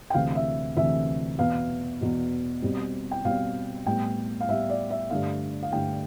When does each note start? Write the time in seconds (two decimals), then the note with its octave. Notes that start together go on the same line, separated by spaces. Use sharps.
0.10 G5
0.14 D2 C3 E3 A3 C4 F5
0.35 E5
0.77 D2 C3 E3 A3 C4 E5
1.38 E2 B2 B3 F5
2.01 E2 B2 B3
2.62 B2 G3 C4
3.11 G5
3.25 B2 G3 C4 F5
3.86 A2 G3 B3 G5
4.41 F5
4.48 A2 G3 B3 E5
4.70 D5
4.90 E5
5.10 G2 D3 A3 F5
5.63 F5
5.72 G2 D3 A3 G5